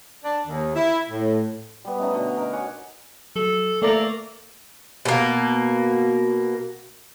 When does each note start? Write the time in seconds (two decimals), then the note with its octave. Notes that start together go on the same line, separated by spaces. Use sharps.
0.24 D4
0.47 D#2
0.76 E4
1.10 A2
1.85 G3 B3
1.98 A3 C#4 D#4
2.13 B2 D3 D#5 C#6
2.37 D#4 A#4
2.53 C#5 F#5 G#5 D6
3.36 F#3 A4
3.82 A3 A#3 A4 D5 A#5
5.05 B2 A#3